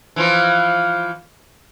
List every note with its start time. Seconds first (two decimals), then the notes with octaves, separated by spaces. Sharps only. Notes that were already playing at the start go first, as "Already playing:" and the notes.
0.16 E3 F3 F4